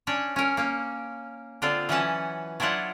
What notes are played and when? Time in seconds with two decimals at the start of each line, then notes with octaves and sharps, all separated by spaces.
0.07 C#4 D4 C#5
0.36 C#4 A#4
0.57 A#3 C#4
1.62 D3 C4 D4 F4
1.89 E3 F#3 C#4 B4 F#5 A5
2.60 F#3 D4 E4 F4 F#5